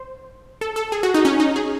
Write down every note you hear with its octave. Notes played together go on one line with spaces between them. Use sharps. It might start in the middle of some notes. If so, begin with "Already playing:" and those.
Already playing: C5
A4
A4
G#4
F#4
D#4
C#4
D#4
G#4